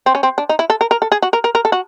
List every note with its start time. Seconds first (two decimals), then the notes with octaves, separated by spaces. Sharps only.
0.06 C4
0.15 C#4
0.23 C4
0.38 D4
0.49 D#4
0.59 E4
0.70 A4
0.81 A#4
0.91 A#4
1.02 A4
1.12 G#4
1.22 F#4
1.33 A#4
1.44 A#4
1.55 A#4
1.65 A4
1.72 F#4